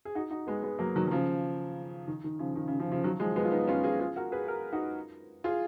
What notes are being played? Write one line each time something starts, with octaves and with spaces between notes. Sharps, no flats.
G#4
D#4 F#4
D#4 F#4
G#3 B3
G#3 B3
F#3 A#3
D#3 F#3
F#3
C#3 F3
D#3
D#3
C#3 F3
D#3
C#3
C#3 F3
C#3 F3
D#3 F#3
F3 G#3
G#3 B3
F4
B3 D#4
C#4 F4
F4 G#4
F4 G#4
F#4 A#4
G#4 B4
F#4 A#4
D#4 F#4
F4 G#4